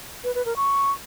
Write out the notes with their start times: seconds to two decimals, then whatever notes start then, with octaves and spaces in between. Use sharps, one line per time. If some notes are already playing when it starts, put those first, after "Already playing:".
0.24 B4
0.35 B4
0.45 A#4
0.56 C#6